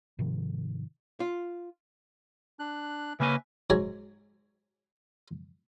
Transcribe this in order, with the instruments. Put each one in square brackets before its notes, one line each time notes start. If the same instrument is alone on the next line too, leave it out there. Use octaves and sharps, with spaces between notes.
[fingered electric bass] G#2 C3 D#3 F3
[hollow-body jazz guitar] F4
[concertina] D4 F#6
[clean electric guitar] C#3 A#3 G#5 [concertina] C#4 B4 E5
[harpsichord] G#2 F#3 C#5 G#5